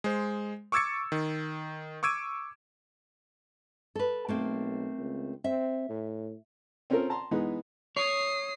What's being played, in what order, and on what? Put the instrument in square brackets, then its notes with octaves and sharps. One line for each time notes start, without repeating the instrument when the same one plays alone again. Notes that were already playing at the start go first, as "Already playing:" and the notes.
[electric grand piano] G#3 C5
C#6 D6 E6 G#6 A6 C#7
D#3
C#6 D6 E6 G#6 D7 D#7
[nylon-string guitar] A4 B4
[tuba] B1 [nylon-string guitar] A3 A#3 C4
[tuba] C#2
[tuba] C4 [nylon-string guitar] E5
[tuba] A2
[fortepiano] C4 C#4 F4 A4 A#4
A5 A#5 C6
E3 G#3 B3 D#4
[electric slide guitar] C#5 [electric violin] D#6 C7